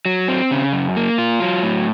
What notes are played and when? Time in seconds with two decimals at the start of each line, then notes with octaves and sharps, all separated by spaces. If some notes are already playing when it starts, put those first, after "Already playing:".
0.06 F#3
0.28 C4
0.51 C#3
0.73 F#2
0.97 A#3
1.18 F4
1.42 F#3
1.63 A2